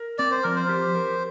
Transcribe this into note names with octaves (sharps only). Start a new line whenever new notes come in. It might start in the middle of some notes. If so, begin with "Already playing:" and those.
Already playing: A#4
C4 D5
C5
F3 A#4
C5
G4
A#4